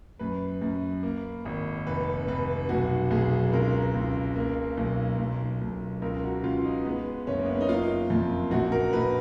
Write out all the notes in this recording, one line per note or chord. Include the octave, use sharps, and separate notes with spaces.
F#2 B4
F#2
A#3
G#1
F1 B4
F1 B4
B1 F#4
B1 G#4
C#2 A#4
C#2
A#3
B1
B1
B1
C#2 A#4
F#4
C#2 F4
D#4
G#3 B3
F#1 C#4
A#3
B3
C#4
D#4
A#3 F4
F2
A#1 F#4
A#4
A#1 B4